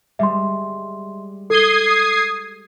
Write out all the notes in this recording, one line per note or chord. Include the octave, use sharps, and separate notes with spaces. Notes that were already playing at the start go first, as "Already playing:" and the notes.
G3 G#3 E5 C6
A4 D#6 G#6 C7 G7